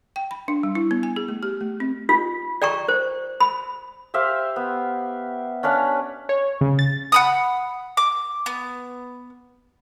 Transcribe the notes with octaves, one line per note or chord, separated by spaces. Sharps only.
G5
B5
D4
G3
E4
B3
G#5
G#4
A3
G4
A3
C4
F4
D5 G5 A#5 C#6
C5
B5
G4 C5 E5 F5
B3
C#4 D4 B4 F5
C#5
C#3
A6
F#5 B5 D#6
D6
B3